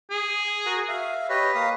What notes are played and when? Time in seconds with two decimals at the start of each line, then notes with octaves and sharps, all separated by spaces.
0.11 G#4
0.66 F#4 A#4 F#5
0.88 E5 F5
1.29 G4 B4 C#5 D#5
1.55 A#3 F5 D#6